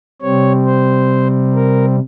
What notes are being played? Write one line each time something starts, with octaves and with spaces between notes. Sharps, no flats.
C3 G3 C4 C#5
C5
A#4